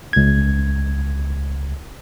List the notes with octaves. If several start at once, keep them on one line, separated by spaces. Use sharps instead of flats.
C#2 G#6